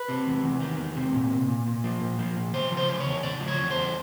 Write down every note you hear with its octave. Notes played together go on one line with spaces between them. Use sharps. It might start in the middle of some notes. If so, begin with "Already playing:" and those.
Already playing: B4
C3
E2
E2
D#3
E2
C3
A#2
A#2
A#2
A#2
F3
A#2
F3
A#2
C#3 C5
F3
C5
C#3
C#5
E2
C#3 D5
F3
C#5
E2
C5
E2